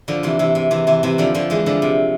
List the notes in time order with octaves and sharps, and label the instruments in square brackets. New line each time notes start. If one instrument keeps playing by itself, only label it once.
[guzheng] D3 F3
C3 E3
C3 E3
C3
C3 E3
C3 E3
C3 E3
D3 F3
D3 F3
E3 G#3
D3 F3
C3